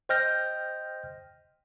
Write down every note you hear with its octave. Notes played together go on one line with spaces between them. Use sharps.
C5 D#5 G5 F6 G6 A#6